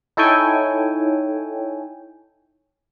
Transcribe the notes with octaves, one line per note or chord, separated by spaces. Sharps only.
D#4 E4 A4 C#5 G5 G#5